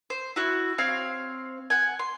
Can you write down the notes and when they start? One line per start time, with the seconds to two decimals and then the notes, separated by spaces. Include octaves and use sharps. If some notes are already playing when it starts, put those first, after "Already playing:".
0.10 C5
0.36 E4 F#4
0.78 C4 C#5 F5
1.70 F#5 G#5
1.99 C6